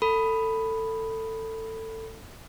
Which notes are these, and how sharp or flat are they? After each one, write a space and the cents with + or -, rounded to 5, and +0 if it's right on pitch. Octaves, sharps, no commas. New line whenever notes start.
A4 +20 B5 +0